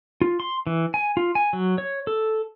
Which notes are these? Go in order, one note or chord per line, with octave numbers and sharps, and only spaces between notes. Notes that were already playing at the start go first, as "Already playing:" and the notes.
F4
C6
E3
G#5
F4
G#5
F#3
C#5
A4